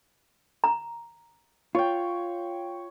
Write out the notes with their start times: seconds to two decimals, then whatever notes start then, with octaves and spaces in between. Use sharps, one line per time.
0.64 A#5
1.75 F4 C#5 G5